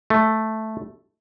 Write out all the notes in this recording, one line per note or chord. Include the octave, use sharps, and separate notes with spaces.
A3